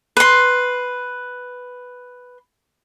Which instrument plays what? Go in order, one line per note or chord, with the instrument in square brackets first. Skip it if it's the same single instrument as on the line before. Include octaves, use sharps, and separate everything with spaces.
[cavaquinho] B4 C6